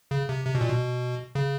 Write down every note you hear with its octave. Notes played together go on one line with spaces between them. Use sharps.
C#3
C3
C3
B2
A#2
B2
C#3